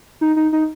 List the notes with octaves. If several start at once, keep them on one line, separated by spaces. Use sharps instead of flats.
D#4
D#4
D#4